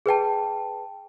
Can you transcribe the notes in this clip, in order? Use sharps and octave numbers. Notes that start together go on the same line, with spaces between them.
G#4 B4 G5 A5